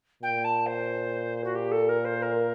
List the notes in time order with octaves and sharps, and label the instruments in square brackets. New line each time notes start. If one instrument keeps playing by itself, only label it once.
[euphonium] A#2 [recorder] G5
[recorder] A5
C5
F#4
G4
A4
A#4
C5
A#4